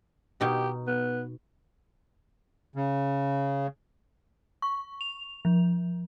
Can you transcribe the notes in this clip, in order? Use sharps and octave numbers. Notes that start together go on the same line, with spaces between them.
B2 D#4 G4
B3
C#3
C#6
F7
F3